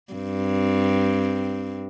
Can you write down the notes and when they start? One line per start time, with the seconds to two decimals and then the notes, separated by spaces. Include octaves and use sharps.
0.13 G2 C4